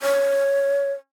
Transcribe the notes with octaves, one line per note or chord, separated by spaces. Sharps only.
C#5